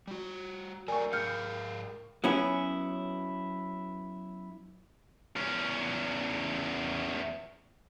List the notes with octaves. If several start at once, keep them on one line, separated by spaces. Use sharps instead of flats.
G3 F#4
F#3 A3 A#4 D5 G5 G#5 C#6
G#2 G#4 F5 F6 G6 C#7
F#3 B3 C#4 E4
E2 C#4